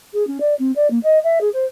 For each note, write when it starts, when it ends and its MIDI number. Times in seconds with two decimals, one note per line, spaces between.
0.13 0.25 68
0.27 0.38 61
0.40 0.54 74
0.59 0.71 60
0.76 0.90 74
0.90 0.99 58
1.03 1.19 75
1.24 1.39 76
1.41 1.49 68
1.53 1.65 72